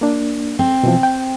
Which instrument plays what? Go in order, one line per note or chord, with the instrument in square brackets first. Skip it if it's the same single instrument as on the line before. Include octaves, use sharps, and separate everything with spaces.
[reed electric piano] A#3 D4
[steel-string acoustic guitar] C4
[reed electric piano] B2 E3 F3
G5